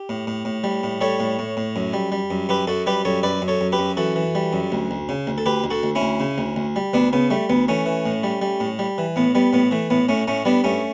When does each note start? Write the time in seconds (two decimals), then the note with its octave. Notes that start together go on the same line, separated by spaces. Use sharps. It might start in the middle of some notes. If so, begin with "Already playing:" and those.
Already playing: G4
0.09 A2
0.27 A2
0.45 A2
0.64 G3
0.83 A2
1.01 G3 A4 C#5
1.20 A2
1.39 A2
1.57 A2
1.76 F#2
1.93 G3
2.12 G3
2.30 F#2
2.49 F#2 G4 B4
2.67 F#2 F#4 A4
2.87 G3 G4 B4
3.05 F#2 A4 C#5
3.23 F#2 B4 D5
3.42 F#2
3.48 A4 C#5
3.61 F#2
3.72 G4 B4
3.79 F#2
3.97 E3 F#4 A4
4.16 E3
4.35 G3
4.53 F#2
4.72 D2
4.91 D2
5.09 C#3
5.27 D2
5.38 A4
5.46 D2 G4 B4
5.64 D2
5.70 F#4 A4
5.83 D2
5.95 C#4 E4
6.02 D2
6.20 C#3
6.38 D2
6.56 D2
6.76 G3
6.93 D2 B3 D4
7.13 C#3 B3
7.30 G3 A3
7.49 D2 B3
7.68 E3 A3 C#4
7.86 E3
8.06 A2
8.23 G3
8.42 G3
8.60 A2
8.79 G3
8.98 E3
9.16 A2 B3
9.35 G3 B3
9.53 A2 B3
9.71 E3 A3
9.90 A2 B3
10.09 A2 A3 C#4
10.28 A2 A3 C#4
10.45 G3 B3 D4
10.64 G2 A3 C#4